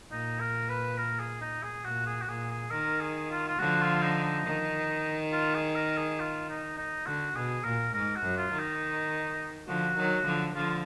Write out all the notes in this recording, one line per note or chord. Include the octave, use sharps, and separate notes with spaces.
A#2 D#4
A#4
B4
A#4
G#4
D#4
G#4
A#2 F#4
G#4
F#4
A#2 G#4
G#4
D#3 A#4
G#4
F4
F4
D3 F3 F#4
F4
D#4
D#4
D#3
F4
G#4
A#4
G#4
F4
D#4
D#4
D3 F#4
B2 G#4
A#2 A#4
G#2 A#4
F#4
F#2
F4
D#3
D#4
D3 F3 F#4
D#3 F#3
D3 F3
D3 F3 F4